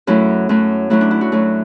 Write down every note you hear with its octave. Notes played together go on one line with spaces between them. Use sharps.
F#2 F#3 A3 E4
F#2 F#3 A3
F#2 F#3 A3 E4
D4
E4
F#4
F#2 F#3 A3